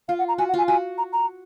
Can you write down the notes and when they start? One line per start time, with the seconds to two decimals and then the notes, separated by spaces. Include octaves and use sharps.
0.08 F4 F5
0.19 F#5
0.28 A#5
0.38 F#4 G#5
0.49 F#5
0.54 F4 G#5
0.68 F#4 G#5
0.98 A#5
1.13 A#5